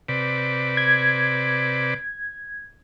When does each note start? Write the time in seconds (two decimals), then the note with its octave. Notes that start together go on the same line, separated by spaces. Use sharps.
0.09 C3 B4 D5
0.77 G#6